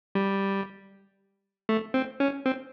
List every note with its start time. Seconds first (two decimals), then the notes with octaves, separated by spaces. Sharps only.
0.15 G3
1.69 A3
1.94 C4
2.20 C#4
2.46 C4